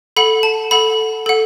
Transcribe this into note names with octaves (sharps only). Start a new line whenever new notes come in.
A4 F#5 B5
A5
A4 F#5 B5
A4 F#5